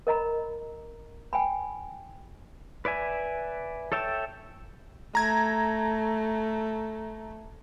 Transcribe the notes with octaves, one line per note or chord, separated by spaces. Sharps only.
A#4 D#5 A#5 B5
G5 G#5 B5
B4 D5 E5 G#5
A4 C#5 E5 G5 A5
A3 A#5 G#6